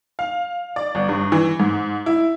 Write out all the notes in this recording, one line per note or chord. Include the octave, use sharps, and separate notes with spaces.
F5
D5
G1
G2
E3
G#2
E4